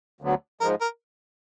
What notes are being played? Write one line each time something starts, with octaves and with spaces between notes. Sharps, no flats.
D2 D3 F#3 B3
G#2 F3 G#3 A#4
A#4